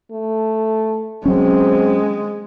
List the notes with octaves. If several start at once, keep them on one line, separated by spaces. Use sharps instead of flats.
A3
F#3 G#3 C4 C#4